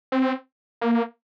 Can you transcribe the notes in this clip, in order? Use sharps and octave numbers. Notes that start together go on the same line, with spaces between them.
C4
A#3